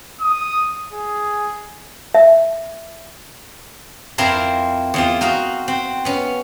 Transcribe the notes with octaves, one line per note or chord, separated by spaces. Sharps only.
D#6
G#4
E5
F2 C4 E4 A#4 F5 C6
E2 C4 F4
D#4 F#4 F5 A#5
C4
B3 C#4